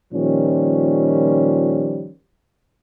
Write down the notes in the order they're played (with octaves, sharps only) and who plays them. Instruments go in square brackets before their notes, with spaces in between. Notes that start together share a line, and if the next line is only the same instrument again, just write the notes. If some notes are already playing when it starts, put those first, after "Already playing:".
[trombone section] A#2 D#3 F3 G3 C#4